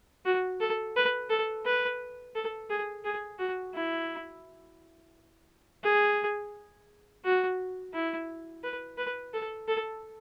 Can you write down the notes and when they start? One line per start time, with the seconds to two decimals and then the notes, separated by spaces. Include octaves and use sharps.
0.25 F#4
0.60 A4
0.96 B4
1.30 A4
1.65 B4
2.35 A4
2.70 G#4
3.05 G#4
3.39 F#4
3.74 E4
5.83 G#4
7.24 F#4
7.94 E4
8.63 B4
8.98 B4
9.33 A4
9.68 A4